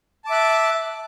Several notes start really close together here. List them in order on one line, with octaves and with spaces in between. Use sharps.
A5 D6 E5 F#6